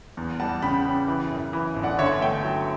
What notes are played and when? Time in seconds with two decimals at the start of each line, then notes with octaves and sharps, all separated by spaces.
0.17 E2
0.40 G3 F#5 A5
0.62 C#3 G5 B5
0.85 C#3
1.08 E3
1.31 F#2
1.53 E3
1.76 G1
1.83 D5 F#5
1.99 D3 C#5 E5
2.21 A3 E5 G5
2.44 F#3